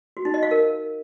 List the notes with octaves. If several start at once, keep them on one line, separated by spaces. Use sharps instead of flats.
F#4
D#4
D#5
F5
A#4